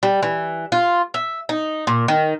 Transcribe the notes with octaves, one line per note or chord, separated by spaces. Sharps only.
G3
E3
F4
E5
D#4
A#2
D#3